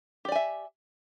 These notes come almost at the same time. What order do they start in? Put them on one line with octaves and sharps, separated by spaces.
G4 D5 G#5 E5